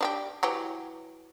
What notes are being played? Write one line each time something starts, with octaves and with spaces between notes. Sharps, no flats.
D4 F#4 G4
E3 F#3 G4